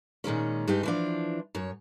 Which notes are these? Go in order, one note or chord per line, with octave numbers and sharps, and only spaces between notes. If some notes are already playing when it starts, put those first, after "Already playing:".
A#2 D#3 G#3 C#4
G2 G#3 D#4 G4
E3 F3 D4
F#2 C#5